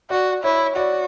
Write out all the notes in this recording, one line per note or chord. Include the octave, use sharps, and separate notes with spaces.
F#4 D5
E4 C#5
F#4 D5